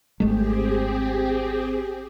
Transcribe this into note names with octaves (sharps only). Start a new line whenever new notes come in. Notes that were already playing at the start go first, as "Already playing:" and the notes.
G#1 G#3 A3 C4 G4 G#4